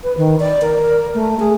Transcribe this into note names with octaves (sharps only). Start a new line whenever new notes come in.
B4
D#3
D5
A#4
A3
G#4